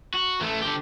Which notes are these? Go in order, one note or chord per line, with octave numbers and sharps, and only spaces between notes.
F#4
E3 A3
D3 G4